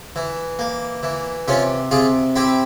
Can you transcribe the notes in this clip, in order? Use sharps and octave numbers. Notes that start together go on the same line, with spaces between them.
E3
A#3
E3
C3 C#4 F4
C3 F4 G#4
C4 E4 G4